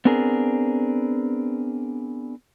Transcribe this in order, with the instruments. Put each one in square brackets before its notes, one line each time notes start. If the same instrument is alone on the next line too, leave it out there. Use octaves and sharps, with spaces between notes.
[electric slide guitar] B3 C4 D4 G#4 A#4